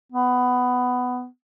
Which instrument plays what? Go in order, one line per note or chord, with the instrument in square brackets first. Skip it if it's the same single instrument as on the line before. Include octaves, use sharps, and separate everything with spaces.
[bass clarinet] B3